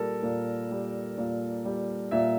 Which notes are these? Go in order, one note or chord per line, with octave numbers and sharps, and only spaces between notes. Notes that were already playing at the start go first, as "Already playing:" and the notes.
Already playing: A#2 G3 A4 A#4
A#2
G3
A#2
G3
A#2 E5